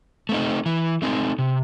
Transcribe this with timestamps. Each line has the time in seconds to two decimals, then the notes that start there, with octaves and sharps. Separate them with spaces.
0.29 A3 C4 D#4
0.66 E3
1.02 A3 C4 D#4
1.39 C3